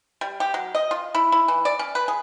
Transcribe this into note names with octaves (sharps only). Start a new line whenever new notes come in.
G3
G4
F#3
D#5
F4
E4
E4
E3
D5
C#4
B4
G#4